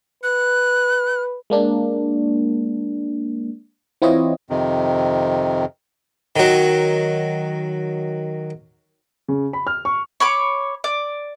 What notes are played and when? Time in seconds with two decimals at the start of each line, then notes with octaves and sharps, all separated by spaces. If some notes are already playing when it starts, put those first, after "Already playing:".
0.23 B4 F#6
1.50 G#3 A#3 D4
4.02 E3 C4 E4 F4 C#5 D#5
4.50 F2 C3 D#3
6.36 D#3 F#3
9.28 C#3
9.53 B5
9.67 F6
9.85 C#6
10.20 C#5 B5 D6
10.84 D5